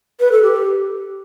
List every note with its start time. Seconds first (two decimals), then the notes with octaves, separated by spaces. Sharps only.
0.20 B4
0.32 A4
0.43 G4